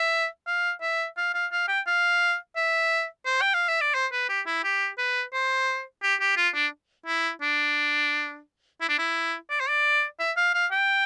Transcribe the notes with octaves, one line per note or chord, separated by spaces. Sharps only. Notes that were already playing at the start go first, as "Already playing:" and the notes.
Already playing: E5
F5
E5
F5
F5
F5
G5
F5
E5
C5
G5
F5
E5
D5
C5
B4
G4
E4
G4
B4
C5
G4
G4
F4
D4
E4
D4
E4
D4
E4
D5
C5
D5
E5
F5
F5
G5